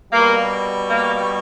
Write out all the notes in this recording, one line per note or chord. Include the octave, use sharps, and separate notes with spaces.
B2 G3 A#3
A#3